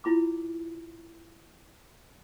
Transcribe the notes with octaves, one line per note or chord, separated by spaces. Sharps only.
E4 F4 B5 D6